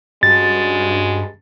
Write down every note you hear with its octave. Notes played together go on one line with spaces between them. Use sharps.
G2 G#3 C#4 D4 F#4 A6